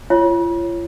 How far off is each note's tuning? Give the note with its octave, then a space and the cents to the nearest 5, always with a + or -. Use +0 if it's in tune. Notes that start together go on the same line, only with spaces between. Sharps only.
F4 -40 C#5 -10